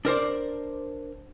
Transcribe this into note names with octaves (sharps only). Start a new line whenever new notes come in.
D4 A#4 C5 D5